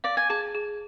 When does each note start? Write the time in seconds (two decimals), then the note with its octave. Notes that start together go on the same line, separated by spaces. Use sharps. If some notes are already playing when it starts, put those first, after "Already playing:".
0.04 D5 F5
0.17 G#5
0.30 G#4 A5
0.55 G#4